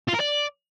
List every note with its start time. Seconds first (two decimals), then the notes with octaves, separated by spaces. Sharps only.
0.08 F4
0.14 A#4
0.20 D5